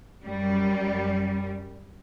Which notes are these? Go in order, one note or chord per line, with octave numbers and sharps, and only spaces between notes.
F#2 G3